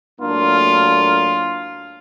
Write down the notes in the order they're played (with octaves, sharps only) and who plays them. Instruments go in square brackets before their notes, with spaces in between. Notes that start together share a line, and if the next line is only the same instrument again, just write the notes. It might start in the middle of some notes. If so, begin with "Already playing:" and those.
[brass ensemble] A2 F#3 A#3 D4 F4